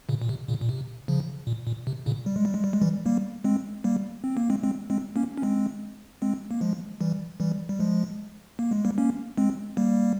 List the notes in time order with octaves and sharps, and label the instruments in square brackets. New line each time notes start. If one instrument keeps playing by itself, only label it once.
[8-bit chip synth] A#2 C#3
A#2
C3
A#2 C#3
A#2
C3
C#3 F3
A#2
A#2
C3
A#2 C#3
G3
G#3
G3
G#3
G3
G#3
E3 G3
G3 A#3
G#3 C4
G3 A#3
C4
A#3
G#3 C4
G#3 C4
G#3 C4
A#3 C#4
C#4
G#3 C4
G#3 C4
A#3
F3 G#3
E3 G3
E3 G3
G3
F3 G#3
A#3
G#3
G3 A#3
A#3 C#4
G#3 C4
G3 A#3